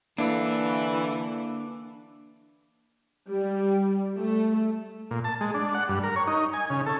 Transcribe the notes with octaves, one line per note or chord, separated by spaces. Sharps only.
D3 E3 A#3 D4
G3
A3
A#2
A5
G#3
D4
F#5
G2
A#4
C#5
D#4
G#5
C#3
A4